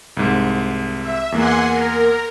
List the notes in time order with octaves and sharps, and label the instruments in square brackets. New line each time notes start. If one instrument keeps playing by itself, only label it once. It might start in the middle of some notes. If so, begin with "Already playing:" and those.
[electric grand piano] C2 G#2
[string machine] E5
[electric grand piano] E2 A#3 [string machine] F#5 G#5 C6
[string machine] A#4